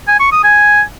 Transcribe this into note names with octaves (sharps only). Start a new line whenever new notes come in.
G#5
C#6
D#6
G#5